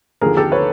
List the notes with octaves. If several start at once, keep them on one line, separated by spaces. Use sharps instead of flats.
D#2 D3 F3 G#4 A#4
G4 A4
B4 C#5